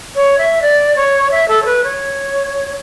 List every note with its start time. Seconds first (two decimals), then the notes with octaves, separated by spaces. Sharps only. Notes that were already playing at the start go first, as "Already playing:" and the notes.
0.16 C#5
0.38 E5
0.62 D5
0.96 C#5
1.31 E5
1.48 A4
1.62 C#5
1.65 B4
1.84 C#5